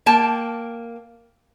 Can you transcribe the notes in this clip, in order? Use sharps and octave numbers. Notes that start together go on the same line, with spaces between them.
A#3 G5 A5